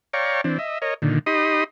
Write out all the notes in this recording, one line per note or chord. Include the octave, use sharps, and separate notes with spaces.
C#5 D5 F5 G5 A#5 C#6
E3 C4 D4
D#5 E5
A#4 C#5 D#5
A#2 D3 D#3
D#4 G4 D#5 B5 C6 D#6